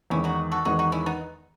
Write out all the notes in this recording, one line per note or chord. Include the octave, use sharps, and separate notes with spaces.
E2 D#3 G#3 C#4 E4
D#4 F#4
F#4 A4
E2 D#3 G#3 D#4 F#4
D#4 F#4
C#4 E4
B3 D#4